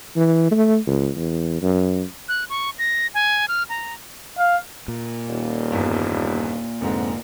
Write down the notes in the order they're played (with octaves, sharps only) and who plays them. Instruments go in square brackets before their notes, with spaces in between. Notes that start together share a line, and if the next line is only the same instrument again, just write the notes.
[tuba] E3
A3
C#2
E2
F#2
[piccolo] F#6
C#6
A#6
G#5
F6
A#5
[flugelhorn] F5
[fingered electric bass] A#2
[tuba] D#1
[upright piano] G1 E2 G2
[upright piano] F1 G#2 D3 [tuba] C4